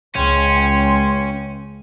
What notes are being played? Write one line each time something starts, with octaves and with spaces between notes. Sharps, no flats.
C#2 C#4 G5 G#5 C6